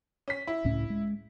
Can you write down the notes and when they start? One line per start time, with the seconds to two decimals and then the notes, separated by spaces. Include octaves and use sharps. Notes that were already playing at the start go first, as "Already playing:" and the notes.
0.28 C#4 B6
0.47 E4
0.65 C#2 A2 C#4
0.90 G#3